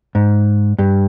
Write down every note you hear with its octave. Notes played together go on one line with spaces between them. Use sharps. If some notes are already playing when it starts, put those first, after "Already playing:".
G#2
G2